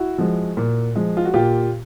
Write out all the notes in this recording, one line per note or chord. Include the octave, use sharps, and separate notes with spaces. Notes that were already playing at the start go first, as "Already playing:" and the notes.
Already playing: E4 F#4
F3 G#3
A#2
F3 G#3
F4
F#4
A#2 F4 G4